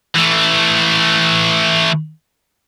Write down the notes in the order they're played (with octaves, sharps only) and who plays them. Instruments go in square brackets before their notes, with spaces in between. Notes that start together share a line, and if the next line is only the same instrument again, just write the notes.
[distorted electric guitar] E3 A3